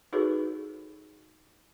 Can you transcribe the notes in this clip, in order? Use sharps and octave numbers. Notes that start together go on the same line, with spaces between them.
D#4 F#4 G#4 A4 B4 C#5